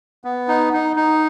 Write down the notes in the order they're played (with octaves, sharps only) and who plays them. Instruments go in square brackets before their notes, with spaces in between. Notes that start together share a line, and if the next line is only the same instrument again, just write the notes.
[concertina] B3
D#4
D#4
D#4